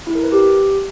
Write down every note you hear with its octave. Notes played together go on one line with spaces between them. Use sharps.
E4
A#4
B4
G4